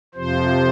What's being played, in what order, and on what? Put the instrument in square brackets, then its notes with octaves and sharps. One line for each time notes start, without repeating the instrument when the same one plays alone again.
[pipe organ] F2 C3 F3 C5